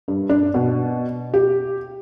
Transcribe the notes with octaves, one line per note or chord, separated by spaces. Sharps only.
G2
D4
B2
G4